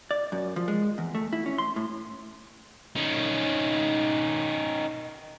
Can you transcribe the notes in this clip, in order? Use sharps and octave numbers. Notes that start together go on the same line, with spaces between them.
D5
F#2
F3
G#3
E2
A3
E4
C#4
C6
A2
D#3 C#4